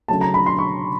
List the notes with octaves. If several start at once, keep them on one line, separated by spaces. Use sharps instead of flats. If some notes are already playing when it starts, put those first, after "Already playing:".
C#3 F#3 A3 A5
A#5
B5
C6
C#6